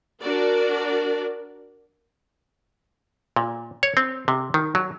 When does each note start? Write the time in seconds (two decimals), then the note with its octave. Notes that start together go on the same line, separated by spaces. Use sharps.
0.21 D4 F#4 A#4 D5
3.36 A#2
3.83 C#5
3.97 C4
4.28 C3
4.54 D#3
4.75 F#3